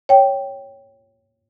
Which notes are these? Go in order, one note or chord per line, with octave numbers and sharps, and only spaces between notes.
C#5 G5